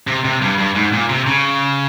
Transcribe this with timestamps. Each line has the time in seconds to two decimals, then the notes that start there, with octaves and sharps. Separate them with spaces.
0.07 C3
0.25 C3
0.42 G2
0.58 G2
0.76 G#2
0.93 A#2
1.09 C3
1.26 C#3